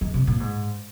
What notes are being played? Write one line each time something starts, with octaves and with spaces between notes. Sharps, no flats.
D#3
C3
A#2
G#2